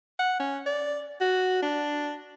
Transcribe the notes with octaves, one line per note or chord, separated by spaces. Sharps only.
F#5
C#4
D5
F#4
D4